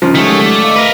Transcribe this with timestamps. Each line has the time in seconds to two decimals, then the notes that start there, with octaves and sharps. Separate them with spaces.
0.02 D#2 C#3 F3
0.15 D#3 F#3 G#3 A3 G4 G#4 C#5
0.46 D5
0.62 D#5 F5
0.76 A#4 B4